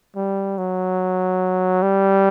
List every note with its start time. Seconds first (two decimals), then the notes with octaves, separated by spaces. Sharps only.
0.16 G3
0.58 F#3
1.82 G3